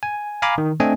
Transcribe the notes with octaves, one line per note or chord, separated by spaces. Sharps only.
G#5
F5 G#5 A#5 B5 D6
D#3
A3 C4 D4 D#5 G#5